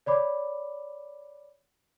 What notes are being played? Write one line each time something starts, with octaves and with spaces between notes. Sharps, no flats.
C#5 D5 B5 D6